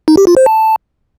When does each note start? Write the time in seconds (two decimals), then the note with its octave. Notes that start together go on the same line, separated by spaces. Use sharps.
0.08 D#4
0.17 G4
0.27 F4
0.37 C5
0.46 A5